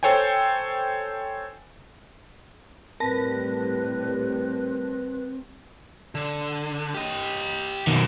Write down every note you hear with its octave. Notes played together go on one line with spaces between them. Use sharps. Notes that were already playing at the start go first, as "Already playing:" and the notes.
A4 C5 C#5 G5 G#5
A2 G3 C4 A#4 B4 A5 A#6
D3
G4 D#5
F#2 B2 D#3